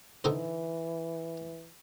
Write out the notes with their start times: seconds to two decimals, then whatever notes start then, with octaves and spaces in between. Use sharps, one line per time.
0.24 D3 E3 D#4 C5